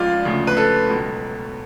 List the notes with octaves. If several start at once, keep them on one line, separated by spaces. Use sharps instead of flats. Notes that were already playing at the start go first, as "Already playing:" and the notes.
Already playing: C#2 C#3 F3 G#3 F4 D5
D2 C#3 F3
B4
A4
C#2 B2 F#3